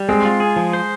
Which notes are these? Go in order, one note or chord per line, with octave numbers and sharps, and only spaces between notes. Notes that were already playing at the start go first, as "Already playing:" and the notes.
Already playing: G3
G#3 C4
F4
G#4
F3
C5